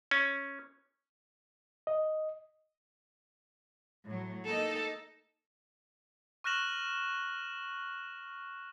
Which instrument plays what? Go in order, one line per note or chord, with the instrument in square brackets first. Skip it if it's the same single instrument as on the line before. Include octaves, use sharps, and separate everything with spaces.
[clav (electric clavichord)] C#4
[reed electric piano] D#5
[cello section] A2 F#3
[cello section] A#3 D#4 D#5 [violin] A4
[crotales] C#6 F6 F#6 A#6 E7 F#7